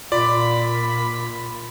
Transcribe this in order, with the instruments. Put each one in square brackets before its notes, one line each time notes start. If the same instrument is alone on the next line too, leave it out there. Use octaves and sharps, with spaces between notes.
[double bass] A#2 [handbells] F4 [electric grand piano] D5 [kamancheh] B5